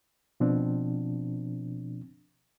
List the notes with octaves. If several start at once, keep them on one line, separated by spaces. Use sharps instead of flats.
B2 F3 C4 D4